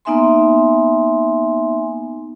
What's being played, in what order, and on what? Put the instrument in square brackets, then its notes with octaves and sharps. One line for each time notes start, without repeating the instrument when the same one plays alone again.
[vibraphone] A#3 B3 D#4 E5 G#5 C6